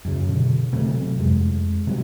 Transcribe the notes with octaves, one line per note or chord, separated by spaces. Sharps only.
F#2 C#3
B2 D3
E1 C3 F#3 A3
F2 G#3
C3 F#3 G3